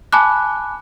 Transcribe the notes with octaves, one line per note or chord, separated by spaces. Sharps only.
G#5 A5 B5 D6 F#6